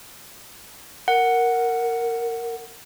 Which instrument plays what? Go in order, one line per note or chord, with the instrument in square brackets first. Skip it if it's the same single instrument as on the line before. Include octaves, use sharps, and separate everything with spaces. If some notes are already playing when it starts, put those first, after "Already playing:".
[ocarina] A#4 [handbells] F#5